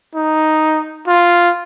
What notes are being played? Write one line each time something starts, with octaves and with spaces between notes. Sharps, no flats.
D#4
F4